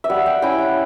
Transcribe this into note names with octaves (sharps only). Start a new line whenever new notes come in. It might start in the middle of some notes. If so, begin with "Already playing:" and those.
E5
G3 F#5
G5
C#4 E4 G5
F#5